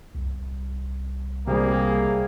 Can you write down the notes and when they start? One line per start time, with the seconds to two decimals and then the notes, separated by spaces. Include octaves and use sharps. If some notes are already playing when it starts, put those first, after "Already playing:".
0.15 C2
1.47 C3 G3 A#3 G#4